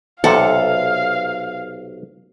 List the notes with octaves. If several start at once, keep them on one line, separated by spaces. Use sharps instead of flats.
B1 C3 A4 F5 F#5